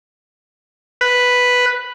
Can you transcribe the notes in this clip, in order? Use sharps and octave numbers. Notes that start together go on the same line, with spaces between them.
B4